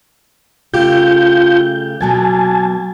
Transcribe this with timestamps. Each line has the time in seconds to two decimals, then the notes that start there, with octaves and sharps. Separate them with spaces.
0.74 C#3 A3 F4 G4 G6
2.01 B2 F#3 A#3 G#5 A5